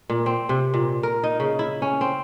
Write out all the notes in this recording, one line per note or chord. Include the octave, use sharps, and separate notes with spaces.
A#2
C4
C3
A#2
A#4
D#4
C#3
E4
C#4
C4